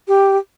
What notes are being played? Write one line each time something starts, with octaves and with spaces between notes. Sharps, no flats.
G4